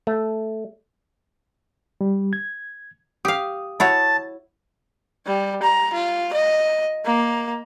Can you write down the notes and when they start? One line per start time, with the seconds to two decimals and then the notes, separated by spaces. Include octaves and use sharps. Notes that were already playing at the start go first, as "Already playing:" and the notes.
0.07 A3
2.01 G3
2.33 G#6
3.25 G4 F5 D#6
3.80 E4 F#4 C#5 A5
5.27 G3
5.63 A#5
5.93 F4
6.33 D#5
7.05 A#3